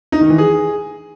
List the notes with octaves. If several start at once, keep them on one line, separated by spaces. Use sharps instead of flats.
D#4
D#3
E3
G#4